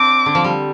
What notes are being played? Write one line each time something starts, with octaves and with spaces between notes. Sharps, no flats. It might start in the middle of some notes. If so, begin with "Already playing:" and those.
Already playing: C4 D4 D6
D3
F3
G3